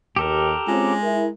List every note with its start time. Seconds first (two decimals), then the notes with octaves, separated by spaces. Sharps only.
0.16 D#2 G4 A4 A#4
0.68 G#3 C4 C#4 F4
1.01 E4 A#4